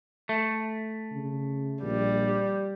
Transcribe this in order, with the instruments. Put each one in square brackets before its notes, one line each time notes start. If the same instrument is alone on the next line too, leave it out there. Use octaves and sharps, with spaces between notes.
[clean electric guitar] A3
[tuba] C#3
[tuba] A#1 [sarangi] G3